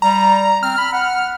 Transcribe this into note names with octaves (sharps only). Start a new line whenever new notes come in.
G3 A#5
C4 F6
B5
F#5